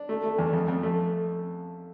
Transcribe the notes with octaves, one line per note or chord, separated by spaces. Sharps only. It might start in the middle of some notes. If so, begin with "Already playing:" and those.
Already playing: D4
A3
A3
E2
F2
F2
A3